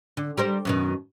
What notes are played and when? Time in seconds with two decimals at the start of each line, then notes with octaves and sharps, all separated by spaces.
0.17 D3
0.37 G3 A#4 C5
0.65 F#2 B2 D#3